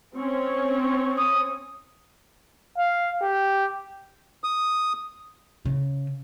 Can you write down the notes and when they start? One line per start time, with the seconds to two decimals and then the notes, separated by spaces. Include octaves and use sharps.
0.15 C4 C#4 C#5
1.18 D#6
2.78 F5
3.22 G4
4.44 D#6
5.65 C#3